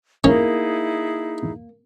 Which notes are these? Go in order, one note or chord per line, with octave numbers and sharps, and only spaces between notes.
A#3 C#4 D#4 E4 G#4